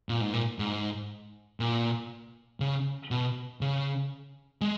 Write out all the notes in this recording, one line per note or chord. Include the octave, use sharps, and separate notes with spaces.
A#2
G#2
A#2
G#2
A#2
C#3
B2
C#3
G#3